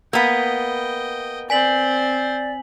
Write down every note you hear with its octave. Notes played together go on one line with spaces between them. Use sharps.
A#3 B3 D#5 G5
C4 C5 D5 G#5 B6 F#7